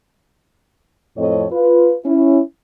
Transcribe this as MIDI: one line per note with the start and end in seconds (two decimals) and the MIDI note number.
1.17 1.45 41
1.17 1.45 45
1.17 1.45 60
1.17 1.45 69
1.17 1.45 73
1.17 1.45 75
1.52 1.94 65
1.52 1.94 71
2.06 2.40 61
2.06 2.40 64